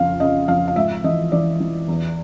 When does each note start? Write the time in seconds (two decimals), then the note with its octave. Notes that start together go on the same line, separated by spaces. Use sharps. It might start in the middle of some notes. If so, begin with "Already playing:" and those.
Already playing: F2 C#3 F5
0.20 C#3 D#5
0.48 F2 F5
0.68 F5
0.76 G#2 E5
1.04 E3 D#5
1.32 E3 D5
1.60 E3
1.88 E2